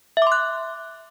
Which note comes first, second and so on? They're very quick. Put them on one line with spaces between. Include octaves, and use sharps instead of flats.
E5 D6 C6 F#6